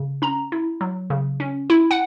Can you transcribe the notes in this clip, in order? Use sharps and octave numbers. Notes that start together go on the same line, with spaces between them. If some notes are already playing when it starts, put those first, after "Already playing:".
Already playing: C#3
C#4 A#5
E4
F#3
C#3
C#4
E4
F#5